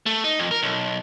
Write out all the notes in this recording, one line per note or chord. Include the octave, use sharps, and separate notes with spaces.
A3
D#4
F2
A#4
B1